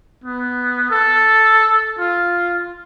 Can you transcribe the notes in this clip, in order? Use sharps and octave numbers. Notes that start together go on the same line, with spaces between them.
B3
A4
F4